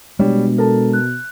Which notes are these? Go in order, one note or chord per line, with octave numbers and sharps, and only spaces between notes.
B2 G3 G#3 D4 C#5
A4 A#4 A5
F#6